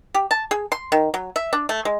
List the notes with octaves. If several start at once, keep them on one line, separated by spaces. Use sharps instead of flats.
G4
A5
G#4
C6
D#3
F#3
E5
D4
A3
G#3